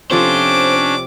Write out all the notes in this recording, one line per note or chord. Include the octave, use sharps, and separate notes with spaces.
C3 F3 C#4 D4 A4 C5 D6